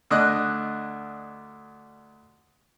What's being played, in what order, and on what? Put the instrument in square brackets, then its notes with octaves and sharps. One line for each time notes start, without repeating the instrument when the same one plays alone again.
[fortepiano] D2 D4 D#5 D#6 F#6